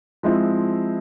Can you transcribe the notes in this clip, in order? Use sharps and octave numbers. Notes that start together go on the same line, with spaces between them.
F3 G#3 C4 E4